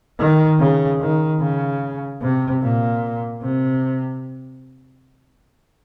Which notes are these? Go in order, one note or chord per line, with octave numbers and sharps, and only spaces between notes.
D#3
C#3
D#3
C#3
C3
A#2
C3